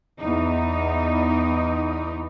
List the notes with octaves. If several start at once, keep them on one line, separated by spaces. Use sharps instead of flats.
E2 D#4